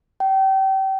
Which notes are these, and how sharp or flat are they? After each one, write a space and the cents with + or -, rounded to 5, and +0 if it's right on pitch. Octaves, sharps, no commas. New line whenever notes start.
G5 -30